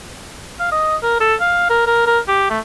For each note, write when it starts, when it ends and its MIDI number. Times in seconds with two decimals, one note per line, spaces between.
0.60 0.72 77
0.72 0.96 75
1.03 1.17 70
1.20 1.35 69
1.41 1.66 77
1.70 1.85 70
1.87 2.05 70
2.06 2.19 70
2.28 2.48 67
2.50 2.59 57